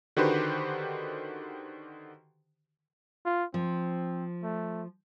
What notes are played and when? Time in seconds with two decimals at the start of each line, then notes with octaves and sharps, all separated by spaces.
0.17 D3 D#3 F#4 G4 B4 C5
3.26 F4
3.54 F3 C4
4.43 A3